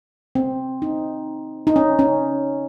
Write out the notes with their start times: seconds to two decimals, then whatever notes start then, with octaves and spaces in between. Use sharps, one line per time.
0.35 C4
0.82 D#4
1.67 D#4
1.76 C#4
1.99 C#4